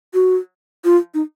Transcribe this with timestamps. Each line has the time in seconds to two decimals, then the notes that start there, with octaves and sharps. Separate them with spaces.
0.14 F#4
0.85 F4
1.14 D#4